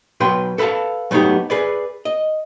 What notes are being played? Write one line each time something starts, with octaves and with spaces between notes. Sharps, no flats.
B2 F#3 B4 G5 C6
A4 B4 E5 F5 A5
F#3 A3 B3 C4 D#4 G4
G#4 B4 D5
D#5